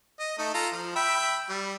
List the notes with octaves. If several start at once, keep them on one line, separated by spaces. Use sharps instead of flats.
D#5
A3 D#4
F4 A4 A#5
F3
E5 G5 B5
G3